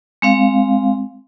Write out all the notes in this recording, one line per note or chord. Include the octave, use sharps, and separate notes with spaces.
G#3 C4 F5